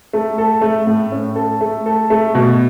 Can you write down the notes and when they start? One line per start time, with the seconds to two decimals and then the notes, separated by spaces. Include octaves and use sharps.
0.13 A3
0.38 A4
0.62 A3
0.87 A2
1.12 C#4
1.35 A4
1.61 A3
1.86 A4
2.10 A3
2.35 B2